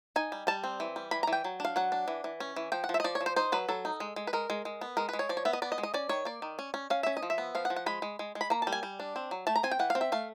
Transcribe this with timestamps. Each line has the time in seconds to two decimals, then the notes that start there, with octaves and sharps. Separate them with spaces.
0.16 D#4 G#5
0.32 G3
0.47 G3 A5
0.64 C4
0.80 E3
0.96 G3
1.11 E3 B5
1.23 A#5
1.27 E3
1.33 G5
1.44 F#3
1.60 D4 F5
1.76 F#3 F#5
1.92 D4
2.08 E3
2.24 E3
2.40 C#4
2.56 E3
2.72 F3 G5
2.84 F#5
2.89 F3
2.94 E5
3.00 D#5
3.04 F3 D5
3.15 C#5
3.21 F3
3.26 C5
3.36 D#4 C5
3.52 F#3 B4
3.69 F#3 A4
3.85 D#4
4.00 G#3
4.16 G#3
4.27 B4
4.33 G#3 A#4
4.50 G#3
4.65 G#3
4.81 B3
4.97 G#3 A#4
5.09 G#3 B4
5.19 C#5
5.29 F3 D5
5.37 C#5
5.45 B3 E5
5.53 D#5
5.62 B3 D5
5.72 D#5
5.78 G#3
5.83 D#5
5.94 C#4 D5
6.09 D#3 C#5
6.25 A#3 D5
6.42 D#3
6.59 C#4
6.74 C#4
6.90 C#4 F5
7.03 C#4 E5
7.17 D#5
7.23 F3
7.30 E5
7.38 B3
7.55 F3 F5
7.65 F#5
7.70 F3
7.76 F#5
7.86 G#3 B5
8.02 G#3
8.19 G#3
8.35 G#3
8.41 B5
8.50 A#3 A#5
8.62 G3 A5
8.72 G#5
8.83 G3
9.00 D4
9.16 C4
9.31 F#3
9.47 A3 A5
9.56 A#5
9.63 C4 G#5
9.71 G5
9.79 E3 F#5
9.90 F5
9.95 C4
10.01 E5
10.12 A3 F5